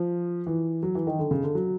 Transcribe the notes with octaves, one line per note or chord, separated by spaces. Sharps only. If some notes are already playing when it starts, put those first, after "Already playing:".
Already playing: F3
E3
F#3
E3
D#3
D3
C#3
D3
F#3